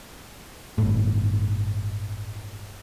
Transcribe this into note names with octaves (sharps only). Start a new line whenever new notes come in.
G1 A2